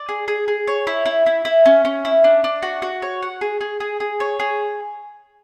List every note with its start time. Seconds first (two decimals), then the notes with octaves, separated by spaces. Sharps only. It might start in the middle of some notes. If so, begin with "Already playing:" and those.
Already playing: D5
0.09 G#4
0.28 G#4
0.48 G#4
0.67 C#5
0.87 E4
1.06 E4
1.26 E4
1.45 E4
1.66 C#4
1.85 C#4
2.05 E4
2.24 D4
2.44 D4
2.62 F#4
2.82 F#4
3.02 C#5
3.22 F#5
3.41 G#4
3.61 G#4
3.80 G#4
4.00 G#4
4.20 C#5
4.40 G#4